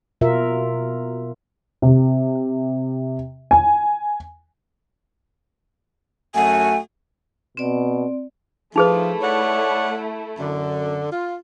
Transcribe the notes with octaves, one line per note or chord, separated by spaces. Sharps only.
B2 F4 A#4 E5
C3
G#5
F#2 A3 F#4 G#5
B2 C4 D5
F3 A3 D#4 E4 G#4 B4
C#5 D5 F#5
F#2 D3
F4